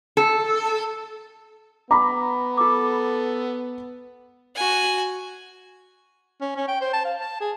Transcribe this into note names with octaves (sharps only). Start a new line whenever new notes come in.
A4
B3 A#5 B5 D6
F4 A4 D6
F#4 G#5
C#4
C#4
G5
C5
A5
F5
A5
G#4